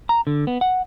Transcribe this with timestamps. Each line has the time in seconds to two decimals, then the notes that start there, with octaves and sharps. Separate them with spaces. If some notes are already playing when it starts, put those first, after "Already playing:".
0.09 A#5
0.27 D3
0.47 B3
0.61 F#5